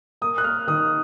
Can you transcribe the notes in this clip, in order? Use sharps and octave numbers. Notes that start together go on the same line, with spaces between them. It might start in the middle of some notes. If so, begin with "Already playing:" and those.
A#3 D#6
F#6
A#3 F6
D#3 D#6